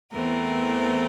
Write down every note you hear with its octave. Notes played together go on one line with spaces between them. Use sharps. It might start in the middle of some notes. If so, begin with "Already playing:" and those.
E2 E3 A3 C4 A#4